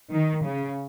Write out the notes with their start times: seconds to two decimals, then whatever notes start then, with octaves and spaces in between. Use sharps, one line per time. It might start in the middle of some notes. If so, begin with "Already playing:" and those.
0.13 D#3
0.45 C#3